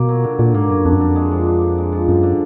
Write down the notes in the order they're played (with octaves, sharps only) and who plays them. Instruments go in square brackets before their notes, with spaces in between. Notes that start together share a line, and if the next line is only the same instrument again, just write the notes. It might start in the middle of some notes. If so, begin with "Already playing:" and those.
Already playing: [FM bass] B2 [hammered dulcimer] A#3
[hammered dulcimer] F#3
D3
[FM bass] A#2 [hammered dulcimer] D3
[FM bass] G#2 [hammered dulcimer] A#3
[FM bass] F#2 [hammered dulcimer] F#3
[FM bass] F2 [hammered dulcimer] D4
[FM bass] F#2
[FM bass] F2 [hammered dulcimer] D3
[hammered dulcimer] G#3
F3
D4
D3
G#3
F3
[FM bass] F#2 [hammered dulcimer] D3
[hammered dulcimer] D3